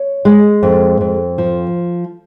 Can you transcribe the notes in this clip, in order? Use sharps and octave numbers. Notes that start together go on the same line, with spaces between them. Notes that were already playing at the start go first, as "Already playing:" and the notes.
Already playing: C#5
G#3
F2
F2
F3